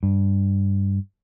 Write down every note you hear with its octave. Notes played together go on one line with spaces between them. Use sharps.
G2